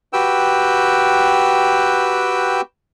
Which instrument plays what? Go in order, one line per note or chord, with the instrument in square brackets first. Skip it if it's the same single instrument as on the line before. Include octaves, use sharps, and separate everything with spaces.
[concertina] F#4 G4 B4 G5 E6